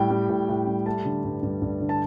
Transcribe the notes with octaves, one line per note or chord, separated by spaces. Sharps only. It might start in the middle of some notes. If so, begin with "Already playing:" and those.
Already playing: A2 G3 G5
G3
A2
A2
G3
A3 A5
D3
G2
G2
G2
D3
A5